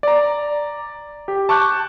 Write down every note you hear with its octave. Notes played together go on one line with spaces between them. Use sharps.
D5 A#5
G4
A5 C#6 D6 F#6 G6